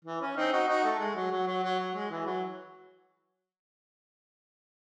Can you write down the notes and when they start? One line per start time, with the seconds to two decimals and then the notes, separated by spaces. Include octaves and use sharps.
0.05 E3
0.21 C#4
0.37 C4 D#4
0.52 D#4 F#4
0.68 D#4 F#4
0.84 A3
1.00 G#3
1.16 F#3
1.31 F#3
1.47 F#3
1.63 F#3
1.80 F#3
1.95 G#3
2.11 E3
2.26 F#3